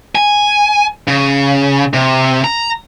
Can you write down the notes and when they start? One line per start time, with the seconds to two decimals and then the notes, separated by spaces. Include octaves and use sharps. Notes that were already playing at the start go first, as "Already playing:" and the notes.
0.15 G#5
1.08 C#3
1.94 C3
2.44 A#5